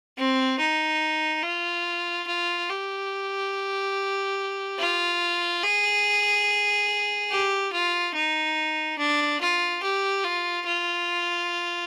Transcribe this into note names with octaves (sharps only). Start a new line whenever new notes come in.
C4
D#4
F4
F4
G4
F4
G#4
G4
F4
D#4
D4
F4
G4
F4
F4